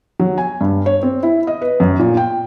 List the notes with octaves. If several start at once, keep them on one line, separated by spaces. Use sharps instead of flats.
F#3
G#5
G2
C#5
C4
E4
D#5
B4
F#2
A#2
G5